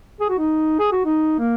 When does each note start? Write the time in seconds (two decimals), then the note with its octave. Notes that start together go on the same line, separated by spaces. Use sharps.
0.20 G#4
0.30 F#4
0.39 D#4
0.79 G#4
0.92 F#4
1.05 D#4
1.39 A#3